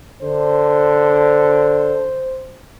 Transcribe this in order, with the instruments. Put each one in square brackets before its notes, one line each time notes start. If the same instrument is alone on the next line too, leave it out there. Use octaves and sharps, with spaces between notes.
[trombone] D3 [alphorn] C5